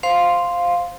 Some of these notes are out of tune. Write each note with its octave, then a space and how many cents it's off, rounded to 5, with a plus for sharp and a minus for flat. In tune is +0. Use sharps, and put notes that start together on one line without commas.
C5 +0 F5 +5 C6 +0